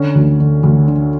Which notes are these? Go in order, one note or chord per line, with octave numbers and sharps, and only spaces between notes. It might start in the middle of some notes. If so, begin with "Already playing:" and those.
Already playing: D3 C#4
D2
D3
D2
D3